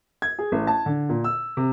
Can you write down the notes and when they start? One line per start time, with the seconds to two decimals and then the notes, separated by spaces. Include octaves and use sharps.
0.22 G#6
0.39 G#4
0.52 A1
0.67 A5
0.86 D3
1.09 A#2
1.24 E6
1.57 C3